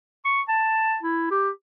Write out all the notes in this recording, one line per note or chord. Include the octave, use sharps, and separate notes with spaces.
C#6
A5
E4
G4